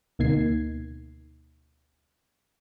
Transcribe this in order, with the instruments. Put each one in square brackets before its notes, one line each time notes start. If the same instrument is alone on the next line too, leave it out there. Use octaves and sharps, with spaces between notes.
[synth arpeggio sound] D2 B2 A#3 D#4 G#6 C7